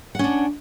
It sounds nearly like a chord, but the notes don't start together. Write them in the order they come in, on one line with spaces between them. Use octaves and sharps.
F#5 C#4 D4